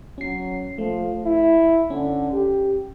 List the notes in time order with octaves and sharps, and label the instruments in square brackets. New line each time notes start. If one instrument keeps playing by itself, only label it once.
[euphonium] F#3 [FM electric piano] C#4 C7
[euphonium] F3 [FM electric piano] A3
[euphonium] E4
[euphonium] D3 [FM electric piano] C#4
[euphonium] G4